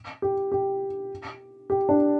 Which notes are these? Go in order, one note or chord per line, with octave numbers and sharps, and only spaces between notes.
G4
G4
G4
D4